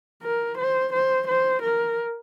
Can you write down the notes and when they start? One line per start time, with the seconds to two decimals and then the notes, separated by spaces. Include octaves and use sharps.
0.22 A#4
0.57 C5
0.92 C5
1.27 C5
1.62 A#4